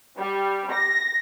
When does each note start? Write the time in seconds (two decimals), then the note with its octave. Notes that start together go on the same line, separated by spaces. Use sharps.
0.18 G3
0.71 A#6